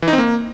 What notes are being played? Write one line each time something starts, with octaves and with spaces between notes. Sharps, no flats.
E3
D#4
C4
A#3